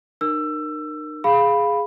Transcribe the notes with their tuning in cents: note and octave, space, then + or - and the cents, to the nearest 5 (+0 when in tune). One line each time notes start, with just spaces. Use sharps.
D#4 -45 A#4 +0 E6 +20
G#4 +0 F5 +0 B5 +0